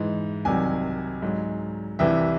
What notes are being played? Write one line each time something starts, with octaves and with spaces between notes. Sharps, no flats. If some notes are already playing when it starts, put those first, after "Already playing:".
Already playing: G#2 E3
C2 C3 D#3 F#3 G#5
G#2 F#3
C2 C3 E3 E5